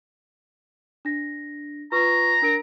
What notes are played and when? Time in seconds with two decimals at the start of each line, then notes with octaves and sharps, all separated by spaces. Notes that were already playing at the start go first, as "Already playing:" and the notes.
1.05 D4 A#6
1.92 F4 B4 A#5 C#6
2.42 D4 A#4 D7